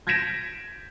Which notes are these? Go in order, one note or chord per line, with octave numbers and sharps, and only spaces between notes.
G6 G#6 A#6 B6 D7 E7